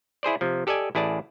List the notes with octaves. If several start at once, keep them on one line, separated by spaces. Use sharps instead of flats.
E4 G#4 C5 D5
C3 F3
G4 A4 D5 D#5 G#5
A1 E4 G#4 D5 A5